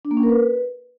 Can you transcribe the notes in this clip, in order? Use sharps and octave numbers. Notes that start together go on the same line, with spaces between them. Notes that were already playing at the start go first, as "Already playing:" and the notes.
D4
A#3
C#4
A#4
B4